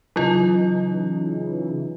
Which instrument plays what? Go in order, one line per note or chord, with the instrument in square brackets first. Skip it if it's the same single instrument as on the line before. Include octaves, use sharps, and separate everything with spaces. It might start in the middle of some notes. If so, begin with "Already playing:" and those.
[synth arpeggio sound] C#3 E3 D#4 [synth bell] F#3 F4